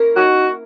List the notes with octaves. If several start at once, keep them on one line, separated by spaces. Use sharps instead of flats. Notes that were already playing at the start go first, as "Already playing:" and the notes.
Already playing: A#3 C#4 E4 A#4
D#4 F#4